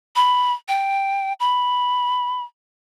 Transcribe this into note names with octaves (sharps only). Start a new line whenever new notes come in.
B5
G5
B5